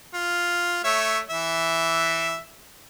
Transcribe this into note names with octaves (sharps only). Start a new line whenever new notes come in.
F4
A3 C#5 E5
E3 E5